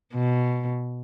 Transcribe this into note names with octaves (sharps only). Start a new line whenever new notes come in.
B2